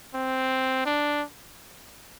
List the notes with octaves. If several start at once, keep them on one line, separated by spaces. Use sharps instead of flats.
C4
D4